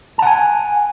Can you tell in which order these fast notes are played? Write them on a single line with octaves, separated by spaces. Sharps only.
A5 F#5 G#5